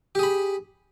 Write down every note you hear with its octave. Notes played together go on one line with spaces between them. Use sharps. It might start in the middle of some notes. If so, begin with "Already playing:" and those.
G4 G#4 B5